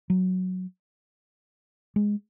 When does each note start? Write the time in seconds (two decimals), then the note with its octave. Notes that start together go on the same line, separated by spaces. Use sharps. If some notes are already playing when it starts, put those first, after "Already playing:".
0.10 F#3
1.96 G#3